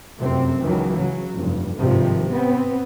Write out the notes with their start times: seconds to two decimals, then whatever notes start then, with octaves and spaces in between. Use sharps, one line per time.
0.19 F1 F#2 C3 C4
0.63 C#2 D#3 E3 F#3
0.97 C#3 F#3
1.34 F1 G2
1.77 G#1 G2 C3 D#3 F3
2.31 B3 C4